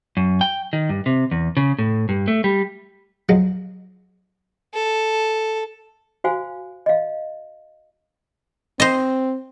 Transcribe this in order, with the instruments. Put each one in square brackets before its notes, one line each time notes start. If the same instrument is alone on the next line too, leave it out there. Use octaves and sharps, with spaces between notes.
[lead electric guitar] F#2
G5
D#3
G2
C3
E2
C#3
A2
G2
A3
G3
[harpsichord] F3 F#3 G#3
[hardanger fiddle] A4
[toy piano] F#4 C5 F5 G#5
D#5 F5
[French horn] C4 [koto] C5 D#5